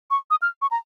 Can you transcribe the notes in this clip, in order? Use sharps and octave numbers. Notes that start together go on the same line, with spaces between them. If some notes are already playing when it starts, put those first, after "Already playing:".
C#6
D#6
F6
C#6
A#5